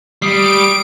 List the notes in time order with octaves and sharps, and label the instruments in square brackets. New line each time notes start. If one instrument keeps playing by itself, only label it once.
[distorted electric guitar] G3 [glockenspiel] D#6 C7 [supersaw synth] D7